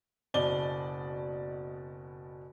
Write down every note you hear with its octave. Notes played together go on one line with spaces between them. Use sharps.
F#1 B2 D5 D#5 G7